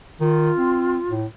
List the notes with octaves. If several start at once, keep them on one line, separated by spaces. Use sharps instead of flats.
D#3 F4
C4
A2